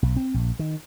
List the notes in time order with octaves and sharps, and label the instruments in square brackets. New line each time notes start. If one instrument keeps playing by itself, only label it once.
[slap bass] B1
C4
A#1
D#3